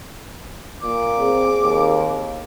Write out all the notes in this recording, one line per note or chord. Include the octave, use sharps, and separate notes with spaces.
A#2 D6
C4 G#4
D#2